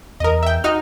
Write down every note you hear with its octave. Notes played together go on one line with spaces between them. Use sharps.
E2 A#4 D#5
E5 G5
D#4 F#4 F6